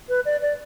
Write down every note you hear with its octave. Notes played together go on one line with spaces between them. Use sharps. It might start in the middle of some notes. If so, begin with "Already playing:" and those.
B4
D5
D5